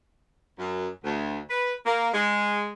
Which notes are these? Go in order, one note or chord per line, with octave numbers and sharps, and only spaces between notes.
F#2
D2
B4
A#3
G#3